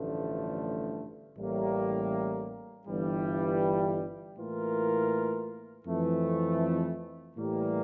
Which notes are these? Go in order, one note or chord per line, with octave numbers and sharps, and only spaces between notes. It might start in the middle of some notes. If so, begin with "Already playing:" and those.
Already playing: A1 G2 D3 F3 A3
A1 A2 G3 A#3
G1 G2 E3 G3
A2 E3 A#3 F4 A#4
F2 E3 A3
A2 E3 G3 A#3